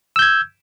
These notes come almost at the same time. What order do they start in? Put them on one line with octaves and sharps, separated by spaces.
E6 G6 G#6